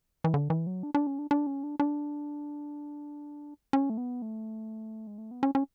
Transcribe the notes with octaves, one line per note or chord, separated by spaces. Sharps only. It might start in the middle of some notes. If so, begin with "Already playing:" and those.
E3
D3
E3
F#3
D4
D4
C#4
D4
D4
C#4
D4
D4
C#4
A3
B3
A3
G#3
A3
B3
C#4
C#4